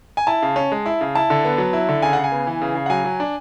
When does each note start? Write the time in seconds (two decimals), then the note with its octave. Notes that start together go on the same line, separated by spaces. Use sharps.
0.17 G#5
0.27 E4 A5
0.42 C#3
0.56 C#4
0.72 G#3
0.86 E4
1.01 C#3
1.15 E4 A5
1.30 D3
1.45 B3
1.58 F#3
1.73 E4
1.88 D3
2.02 C#3 G#5
2.13 C#3 F#5
2.24 G#5
2.32 B3
2.47 E3
2.62 C#3
2.75 C#3
2.86 F#5
2.90 F#3 G#5
3.05 F#3
3.20 D4